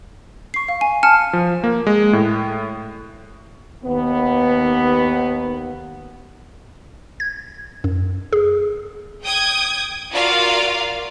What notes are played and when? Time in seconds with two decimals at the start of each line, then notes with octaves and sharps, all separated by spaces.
0.54 C#6 C7
0.68 F5
0.81 G#5
1.03 G#5 A5 F6 C#7
1.33 F3
1.64 A#3
1.87 G#3
2.13 A2
3.85 D#2 B3
7.20 G#6
7.84 F#2
8.33 G#4
9.23 G5 D#6 G6 G#6
10.12 F4 F#4 A#4 D5 F5